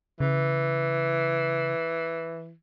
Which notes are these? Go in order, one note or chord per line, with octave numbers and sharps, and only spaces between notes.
C#3 E3